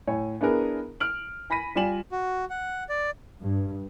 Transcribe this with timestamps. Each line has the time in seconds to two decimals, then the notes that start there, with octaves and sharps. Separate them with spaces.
0.07 A2 C#5 G#5
0.41 B3 D4 E4 G#4 A#4
1.00 F6 D7 F#7
1.50 G#5 B5 A#6 B6 D#7
1.75 G3 F4 D5 G#5 E7 F#7
2.11 F#4
2.50 F#5
2.89 D5
3.41 G2